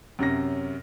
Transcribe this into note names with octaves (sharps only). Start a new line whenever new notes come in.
F#2 C3 C#4 A#6